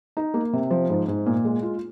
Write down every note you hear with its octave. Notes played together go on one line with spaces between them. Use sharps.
D#4
A#3
C3
F3
G#2
G#2
A#2
G#3
F4